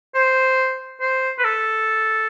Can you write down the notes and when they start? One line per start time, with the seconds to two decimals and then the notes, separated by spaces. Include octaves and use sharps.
0.15 C5
1.01 C5
1.38 B4
1.44 A4